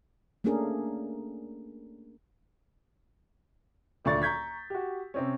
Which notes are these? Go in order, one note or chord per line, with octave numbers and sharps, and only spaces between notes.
A3 A#3 C#4 D4 G#4 A#4
D#1 D2 D5 C#6 A6
A#5 C#6 G6 G#6 B6
F#4 G4
C3 C4 C#4